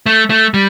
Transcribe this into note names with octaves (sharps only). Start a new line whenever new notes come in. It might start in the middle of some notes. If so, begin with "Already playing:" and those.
A3
A3
G3